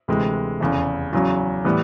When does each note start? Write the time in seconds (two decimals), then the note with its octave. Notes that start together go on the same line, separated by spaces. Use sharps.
0.08 D2 C3 E3 G#3
0.60 F1 E2 C#3
1.13 E2 C#3 F#3
1.65 A2 E3 G3 B3